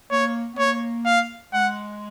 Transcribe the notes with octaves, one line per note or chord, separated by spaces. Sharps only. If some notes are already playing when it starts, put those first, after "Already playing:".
A#3 C#5
B3
A#3 C#5
F5
G#3 F#5